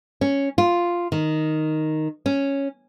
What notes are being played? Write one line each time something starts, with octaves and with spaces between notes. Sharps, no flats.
C#4
F4
D#3
C#4